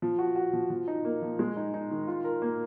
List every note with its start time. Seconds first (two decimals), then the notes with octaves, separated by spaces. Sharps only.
0.02 F3
0.19 F#4
0.36 F#4
0.53 F3
0.70 F3
0.88 D#4
1.05 A#3
1.22 F3
1.39 G#3
1.57 D#4
1.74 D#4
1.90 D#3
2.08 F4
2.24 A#4
2.42 A#3